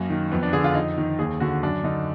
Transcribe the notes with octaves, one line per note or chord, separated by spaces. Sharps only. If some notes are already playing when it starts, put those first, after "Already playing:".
Already playing: F#2 A#3
D#3
F2 B3
D4
D3 G#4
F4
F2 D#4
D#3
D#2 G#4
D3 F#4
F#2 D4
D3 D#4